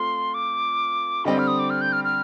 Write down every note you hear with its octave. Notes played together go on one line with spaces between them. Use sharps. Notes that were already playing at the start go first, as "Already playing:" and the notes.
Already playing: A3 C4 F4 C6
D6
D3 G3 C4 G4 D#5
F6
D#6
D6
F6
G6
F6
F6